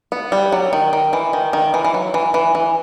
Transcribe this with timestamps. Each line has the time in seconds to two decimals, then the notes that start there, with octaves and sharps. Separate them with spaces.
0.12 B3
0.32 G3
0.52 F#3
0.73 D#3
0.93 D#3
1.13 E3
1.33 D#3
1.53 D#3
1.74 E3
1.84 E3
1.94 F#3
2.14 E3
2.34 E3
2.55 E3